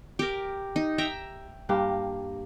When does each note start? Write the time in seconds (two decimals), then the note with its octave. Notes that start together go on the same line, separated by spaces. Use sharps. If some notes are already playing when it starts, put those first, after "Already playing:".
0.19 G4 A#4
0.76 D#4
0.98 E5 G5 A#5
1.69 G2 A#3 G4